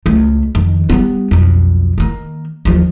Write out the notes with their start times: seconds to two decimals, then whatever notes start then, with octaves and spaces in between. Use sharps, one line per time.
0.06 C#2 A3
0.55 F2 D#3
0.90 G3 B3
1.31 B1 F2
1.98 D#3 A#3
2.65 D#2 F3